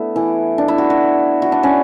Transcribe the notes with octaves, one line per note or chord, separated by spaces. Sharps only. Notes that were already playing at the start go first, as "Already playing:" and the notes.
Already playing: A3 B3 D4 E4
E3
D4
E4
F#4
F#4
F#4
D4
C#4